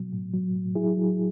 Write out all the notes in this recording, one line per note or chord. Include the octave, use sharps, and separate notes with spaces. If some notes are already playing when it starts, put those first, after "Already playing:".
Already playing: B2 F#3
A2
F#3
A2
F#3 E4 G#4
F#3